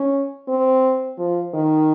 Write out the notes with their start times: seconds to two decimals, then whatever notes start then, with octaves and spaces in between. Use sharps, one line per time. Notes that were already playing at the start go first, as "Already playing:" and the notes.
Already playing: C#4
0.48 C4
1.18 F3
1.54 D#3